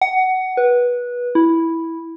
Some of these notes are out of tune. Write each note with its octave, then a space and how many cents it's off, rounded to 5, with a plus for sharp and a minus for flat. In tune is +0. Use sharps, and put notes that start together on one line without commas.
F#5 +15
B4 -20
E4 -5